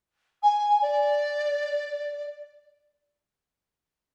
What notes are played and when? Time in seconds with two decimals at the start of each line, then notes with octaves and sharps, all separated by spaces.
0.42 G#5
0.82 D5